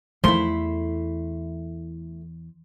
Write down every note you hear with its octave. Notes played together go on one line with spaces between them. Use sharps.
E2 D#3 F3 A3 E4 C6